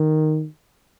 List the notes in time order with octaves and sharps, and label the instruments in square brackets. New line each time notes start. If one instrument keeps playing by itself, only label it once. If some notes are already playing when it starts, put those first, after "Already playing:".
Already playing: [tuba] D#3